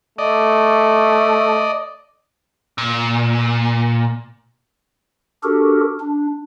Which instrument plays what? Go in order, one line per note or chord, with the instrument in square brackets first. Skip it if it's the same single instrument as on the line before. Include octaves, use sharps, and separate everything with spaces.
[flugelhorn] A3 [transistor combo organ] D5 D#5
[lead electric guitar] A#2
[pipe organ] D4 F#4 G4 A4 A#4
D4